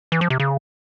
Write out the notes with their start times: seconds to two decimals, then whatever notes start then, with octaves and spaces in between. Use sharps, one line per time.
0.12 E3
0.21 F3
0.30 C3
0.40 C#3